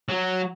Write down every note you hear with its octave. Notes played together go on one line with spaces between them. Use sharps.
F#3